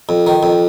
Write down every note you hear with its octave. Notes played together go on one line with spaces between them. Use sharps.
F2
D#3
F2